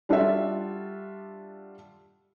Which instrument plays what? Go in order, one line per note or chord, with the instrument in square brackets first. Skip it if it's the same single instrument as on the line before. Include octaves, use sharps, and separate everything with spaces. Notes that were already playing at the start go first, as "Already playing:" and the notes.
[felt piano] G3 D4 F4 F#4 A4 E5